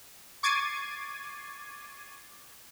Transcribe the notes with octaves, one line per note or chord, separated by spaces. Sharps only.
C#6 D6 G#6 A6 C7 D#7